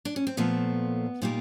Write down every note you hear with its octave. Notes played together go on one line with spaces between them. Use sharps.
D4
C#4
C4
A#2 F3 A3 B3
A#2 G3 A#3 D#4 F4